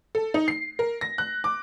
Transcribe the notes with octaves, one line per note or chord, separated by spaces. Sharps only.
A4
D#4
C7
A#4
A#6
F#6
D6